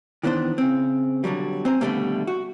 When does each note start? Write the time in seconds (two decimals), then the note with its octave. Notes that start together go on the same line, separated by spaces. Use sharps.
0.23 D#3 E3 B3 D4 C5
0.58 C#3 C4
1.24 B1 D3 D#3 F#3 G3
1.65 C4 C5 G#5 A#5
1.81 D#2 B2 D3 G3 A3 A#3
2.27 F#4